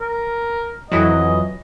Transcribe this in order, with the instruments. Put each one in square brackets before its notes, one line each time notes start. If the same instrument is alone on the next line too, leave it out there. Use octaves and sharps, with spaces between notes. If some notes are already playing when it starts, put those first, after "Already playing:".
[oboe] A#4
[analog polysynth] F2 E3 F#3 [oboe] D#5